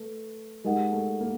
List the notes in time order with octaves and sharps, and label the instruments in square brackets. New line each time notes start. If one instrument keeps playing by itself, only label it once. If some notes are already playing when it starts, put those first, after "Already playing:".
Already playing: [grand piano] A3 [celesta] B4
[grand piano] G#3 [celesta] D#4 G4 A#4 D#5 F#5
[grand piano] A3
A#3